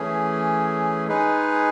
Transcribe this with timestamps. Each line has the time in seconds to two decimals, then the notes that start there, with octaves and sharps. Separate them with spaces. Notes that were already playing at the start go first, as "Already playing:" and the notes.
Already playing: E3 A3 C#4 G#4
1.07 G#3 D#4 G#4 B4